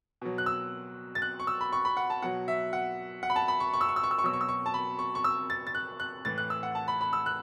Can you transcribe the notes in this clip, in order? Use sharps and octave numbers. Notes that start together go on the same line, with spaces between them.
B2 F#3
F#6
E6
A6
F#6
C#6
E6
B5
C#6
B5
F#5
A5
B2 F#3 F#5
E5
F#5
F#5
B5
A5
B5
C#6
C#6
E6
C#6
E6
C#6
E6
C#6
B2 F#3 E6
C#6
E6
C#6
A5
B5
C#6
C#6
E6
A6
A6
F#6
F#6
A2 E3 A6
F#6
E6
F#5
A5
B5
B5
E6
F#6